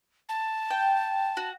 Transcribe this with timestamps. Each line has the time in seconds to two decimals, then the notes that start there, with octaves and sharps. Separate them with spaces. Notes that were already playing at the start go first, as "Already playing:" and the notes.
0.29 A5
0.70 G5
1.37 F#4